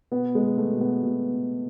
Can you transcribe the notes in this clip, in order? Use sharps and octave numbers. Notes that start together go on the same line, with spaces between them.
B2 B3
G#3
B2
A3
B2
B3
B2
B2